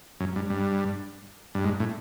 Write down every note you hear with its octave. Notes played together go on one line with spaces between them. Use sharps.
F#2
G2
G2
G2
G#2
A2